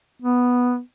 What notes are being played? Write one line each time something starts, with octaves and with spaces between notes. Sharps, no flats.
B3